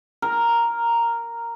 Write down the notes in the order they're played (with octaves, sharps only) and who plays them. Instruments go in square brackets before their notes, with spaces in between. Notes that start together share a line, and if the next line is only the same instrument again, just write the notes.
[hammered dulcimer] A#4